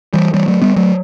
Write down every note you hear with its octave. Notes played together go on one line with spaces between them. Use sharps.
E3 G3
E3 G3
F#3 A3
G3 B3
F#3 A3